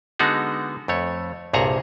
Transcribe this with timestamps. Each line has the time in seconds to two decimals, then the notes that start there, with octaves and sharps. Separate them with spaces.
0.19 D3 G#3 B3 D#4 F#4 G#4
0.88 F2 A3 C#5
1.53 C2 G2 A#2 G#4 C#5 A#5